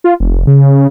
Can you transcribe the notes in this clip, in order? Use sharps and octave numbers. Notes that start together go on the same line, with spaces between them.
F4
F1
C#3